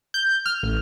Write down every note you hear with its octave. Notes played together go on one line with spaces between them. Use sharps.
G6
F6
A1